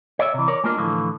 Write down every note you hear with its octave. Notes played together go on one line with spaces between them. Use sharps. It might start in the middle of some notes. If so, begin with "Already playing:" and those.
C#5 D5 E5
C3 E3
A#4 C#5 D5
G#3 A#3 D4 F4 A#4
A2 D3 E3 F3